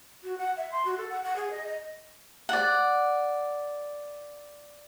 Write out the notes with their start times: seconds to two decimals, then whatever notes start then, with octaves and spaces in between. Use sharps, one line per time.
0.24 F#4
0.38 F#5
0.57 E5
0.72 C6
0.85 F#4
0.98 A4
1.10 F#5
1.24 F#5
1.36 G#4
1.51 D#5
1.68 D#5
2.49 D5 F#5